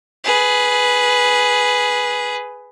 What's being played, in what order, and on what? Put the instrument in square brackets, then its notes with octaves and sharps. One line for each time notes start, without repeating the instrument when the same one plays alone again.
[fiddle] G#4 B4